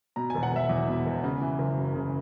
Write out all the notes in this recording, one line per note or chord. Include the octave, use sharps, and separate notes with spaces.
B2 A#5
E1 G#5
F#5
E1 E5
E2
B2
E1
C#3
E3
F#1
F#2
C#3